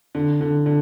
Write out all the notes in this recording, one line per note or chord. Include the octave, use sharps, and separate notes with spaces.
D3
D3
D3